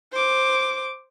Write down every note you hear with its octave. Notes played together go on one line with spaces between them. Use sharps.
C5 D6